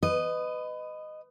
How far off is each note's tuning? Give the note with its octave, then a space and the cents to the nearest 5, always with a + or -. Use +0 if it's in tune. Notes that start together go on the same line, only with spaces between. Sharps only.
B4 +25 D#5 -10